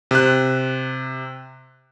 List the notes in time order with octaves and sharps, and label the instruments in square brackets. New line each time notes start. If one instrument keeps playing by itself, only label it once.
[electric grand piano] C3 F#6